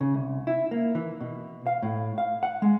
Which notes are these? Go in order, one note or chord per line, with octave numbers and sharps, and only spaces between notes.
C#3
C2
E4
A#3
E3
B2
F5
A2
F5
F#5
G#3